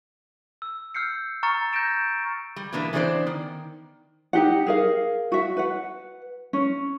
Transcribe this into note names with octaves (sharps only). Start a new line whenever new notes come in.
E6
E6 F6 G6 C7 C#7
A#5 C#6 F6 A6 C#7
G6 A6 A#6 D7 E7
G3
B2 E3 A#3 D4 B4
E3 B3 D4 A4 C5 D5
D#3
D#4 G4 F#5
G#4 A#4 F5
F#4 E5
B4 F#5
C#4